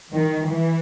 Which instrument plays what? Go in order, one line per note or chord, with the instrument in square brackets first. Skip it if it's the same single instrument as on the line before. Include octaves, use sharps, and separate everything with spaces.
[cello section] D#3
E3